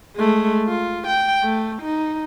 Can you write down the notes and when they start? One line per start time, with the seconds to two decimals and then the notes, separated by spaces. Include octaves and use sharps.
0.17 G#3 A3
0.68 F4
1.07 G5
1.43 A3
1.82 D#4